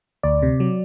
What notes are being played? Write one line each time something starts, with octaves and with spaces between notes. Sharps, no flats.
D2 D5
C3
F#3